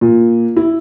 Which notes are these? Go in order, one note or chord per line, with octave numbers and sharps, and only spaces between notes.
A#2
E4